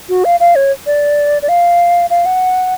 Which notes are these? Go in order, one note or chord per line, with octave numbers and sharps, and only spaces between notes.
F#4
F5
F5
C#5
D5
D5
F5
F5
F#5